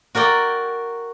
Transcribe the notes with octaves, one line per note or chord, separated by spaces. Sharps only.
F#4 A#4 D5 G5